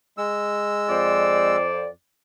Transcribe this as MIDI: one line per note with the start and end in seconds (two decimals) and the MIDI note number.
0.18 1.56 56
0.18 1.56 88
0.89 1.88 41
0.89 1.88 72
0.89 1.88 74